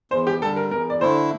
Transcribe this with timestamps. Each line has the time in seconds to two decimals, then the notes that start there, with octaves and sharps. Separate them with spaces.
0.11 E2 C5
0.27 G4
0.41 D3 G3 A4
0.56 A#4
0.71 E2 A#4
0.90 D5
1.01 D3 A3 E4 C5